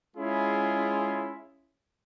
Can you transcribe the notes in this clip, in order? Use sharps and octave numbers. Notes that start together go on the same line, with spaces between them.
G#3 C#4 E4 F4 G#4